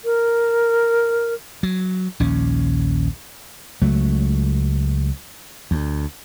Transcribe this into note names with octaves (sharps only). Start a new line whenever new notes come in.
A#4
F#3
A#1 D#2 C#4
C#2 F#3 A3
D2